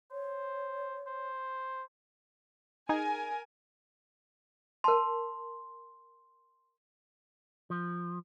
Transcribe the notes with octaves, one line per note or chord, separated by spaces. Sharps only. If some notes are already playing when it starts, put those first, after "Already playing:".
C5 C#5
C5
D#4 G#4 A#4 G#5
A#4 A5 C6
F3